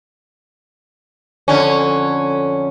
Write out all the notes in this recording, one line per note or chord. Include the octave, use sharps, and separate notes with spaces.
F2 D3 C#4